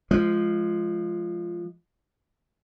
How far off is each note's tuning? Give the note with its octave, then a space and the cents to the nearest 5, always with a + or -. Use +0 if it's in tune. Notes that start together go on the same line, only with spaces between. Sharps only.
F3 -10 G#3 +10